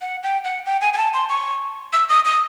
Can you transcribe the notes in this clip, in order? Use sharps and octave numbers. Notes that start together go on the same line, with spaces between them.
F#5
G5
F#5
G5
G#5
G#5
A5
C6
C#6
E6
D#6
D#6